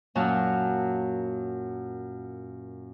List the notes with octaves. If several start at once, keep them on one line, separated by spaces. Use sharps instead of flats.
F#2 A#2 F#3 F#5 A5